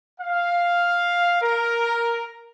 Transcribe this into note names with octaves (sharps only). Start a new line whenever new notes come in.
F5
A#4